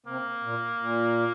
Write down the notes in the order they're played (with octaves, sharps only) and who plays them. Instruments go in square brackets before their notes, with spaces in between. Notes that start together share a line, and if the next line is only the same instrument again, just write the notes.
[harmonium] C3 [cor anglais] A#3
[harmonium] A#2
A#2